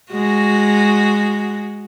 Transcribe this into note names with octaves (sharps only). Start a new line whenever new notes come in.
G#3 F#4